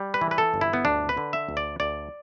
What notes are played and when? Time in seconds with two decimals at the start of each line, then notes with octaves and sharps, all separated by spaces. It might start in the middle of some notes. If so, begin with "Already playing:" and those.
Already playing: G3
0.14 B4
0.21 E3
0.31 B4
0.38 A4
0.54 G1
0.61 E4
0.73 B3
0.85 D2 D4
1.09 B4
1.17 D3
1.33 E5
1.49 D2
1.57 D5
1.80 D2 D5